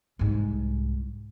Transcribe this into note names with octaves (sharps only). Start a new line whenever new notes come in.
C2 G#2